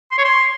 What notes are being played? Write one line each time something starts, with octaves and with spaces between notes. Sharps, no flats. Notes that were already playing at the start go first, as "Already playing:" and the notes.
C6
C#5
C6